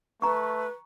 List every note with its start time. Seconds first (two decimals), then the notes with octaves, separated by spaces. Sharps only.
0.22 A3 B4 A#5 C#6